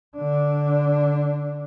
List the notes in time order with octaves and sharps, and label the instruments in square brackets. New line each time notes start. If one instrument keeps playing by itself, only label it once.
[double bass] D3 D4